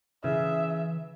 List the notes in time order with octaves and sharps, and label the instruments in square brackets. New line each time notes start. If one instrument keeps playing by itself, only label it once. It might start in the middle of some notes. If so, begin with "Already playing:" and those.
[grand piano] C#3 G#4 [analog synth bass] E3 [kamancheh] E5